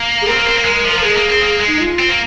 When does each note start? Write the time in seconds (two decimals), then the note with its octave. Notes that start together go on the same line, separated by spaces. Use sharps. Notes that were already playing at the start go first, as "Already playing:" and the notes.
Already playing: A#3
0.22 G#4
0.27 C4 A#4
0.37 A#3
0.46 C4
0.56 A#3
0.65 G#3
0.84 F3
0.91 A#4
0.98 F3
1.03 G#3 G#4
1.16 A#3
1.29 C4
1.41 A#3
1.60 G#3
1.67 D#4
1.80 F4
1.99 C4
2.09 A#3